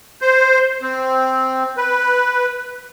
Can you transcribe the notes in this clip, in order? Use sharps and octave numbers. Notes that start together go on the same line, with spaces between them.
C5
C4
B4